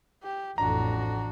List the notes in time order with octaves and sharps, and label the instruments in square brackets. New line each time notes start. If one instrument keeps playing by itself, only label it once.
[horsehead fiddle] G4
[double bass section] A1 F2 A2 [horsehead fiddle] D4 F#4 [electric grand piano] A#5